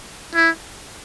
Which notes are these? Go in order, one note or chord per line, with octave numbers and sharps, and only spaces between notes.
E4